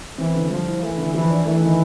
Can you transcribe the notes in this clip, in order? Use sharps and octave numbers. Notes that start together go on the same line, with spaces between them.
E3 C4
D3
F3 G3
E4
E3 A3
D3
E3 F3
D4
E3 A3
D#3